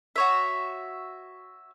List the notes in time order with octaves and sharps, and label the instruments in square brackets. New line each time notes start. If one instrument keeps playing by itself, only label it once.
[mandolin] F#4 C#5 E5